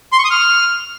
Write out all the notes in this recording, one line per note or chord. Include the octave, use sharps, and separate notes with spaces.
C6
C#6
D#6
F6